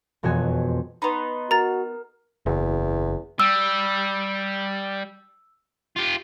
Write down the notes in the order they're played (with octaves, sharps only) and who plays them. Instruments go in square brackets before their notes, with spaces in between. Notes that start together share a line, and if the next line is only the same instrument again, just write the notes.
[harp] E1 F2 B2 F#4 C#5 G#5
[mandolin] B3 D#4 [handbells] B5 C6
[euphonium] F#4 [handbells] A#4 [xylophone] A#5 A6
[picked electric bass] F#1 [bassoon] E2
[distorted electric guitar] G3 [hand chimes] E6
[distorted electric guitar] F4 G4